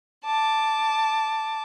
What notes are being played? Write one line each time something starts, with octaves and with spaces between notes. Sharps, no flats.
A5 D6